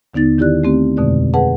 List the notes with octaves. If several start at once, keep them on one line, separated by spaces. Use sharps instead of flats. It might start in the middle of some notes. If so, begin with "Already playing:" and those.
D#2 D3 B3 D#4 A6
D#3 E4 G4 D5 F#6
A3 C4 G4
F2 B2 D3 G#3 D5
G#4 B4 F#5 A5